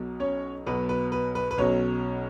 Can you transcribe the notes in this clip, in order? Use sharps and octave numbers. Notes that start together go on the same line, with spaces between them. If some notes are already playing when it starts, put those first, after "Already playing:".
Already playing: B1 B2 F#3
C#4 C#5
B1 B2 F#3 B4
B4
B4
B4
B4
B1 B2 F#3 C#4 C#5